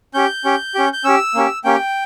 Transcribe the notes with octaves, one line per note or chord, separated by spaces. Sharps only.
C#4 G4 G6
C#4 G4
C#4 G4
G6
C#4 G4 E6
A#3 C#4 G4
A#3 C#4 G4 G5